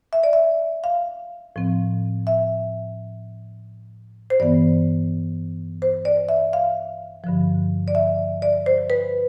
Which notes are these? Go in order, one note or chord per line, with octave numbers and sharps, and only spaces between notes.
E5
D5
E5
F5
A2 F3 C4
E5
C5
G2 E3 B3 D5
C5
D5
E5
F5
G2 D3 F3
D5
E5
D5
C5
B4